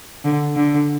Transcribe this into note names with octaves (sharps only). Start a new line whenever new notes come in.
D3
D3